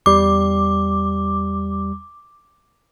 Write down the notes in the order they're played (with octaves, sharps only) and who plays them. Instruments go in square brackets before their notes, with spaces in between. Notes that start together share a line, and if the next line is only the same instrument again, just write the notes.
[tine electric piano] E2 G3 [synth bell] D6